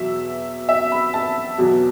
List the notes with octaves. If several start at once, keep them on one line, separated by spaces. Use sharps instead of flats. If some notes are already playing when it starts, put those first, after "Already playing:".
Already playing: E2 B2 F#3 E5
E5
B5
A5
E2 B2 F#3